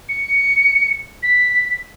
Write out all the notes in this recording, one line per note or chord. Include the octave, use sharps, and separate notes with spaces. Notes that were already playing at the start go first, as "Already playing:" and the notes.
C#7
B6